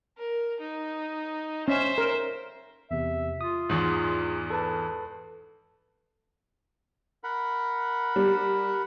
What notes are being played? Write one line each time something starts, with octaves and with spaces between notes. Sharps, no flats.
A#4
D#4
C#4 C5 E5
A#4
E2 C3 E5
F4 D#6
E2 G#2
A4 B4 A5
A#4 F#5 B5
G3